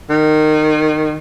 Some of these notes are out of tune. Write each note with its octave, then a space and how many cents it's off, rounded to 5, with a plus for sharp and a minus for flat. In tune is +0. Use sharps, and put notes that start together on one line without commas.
D#3 -20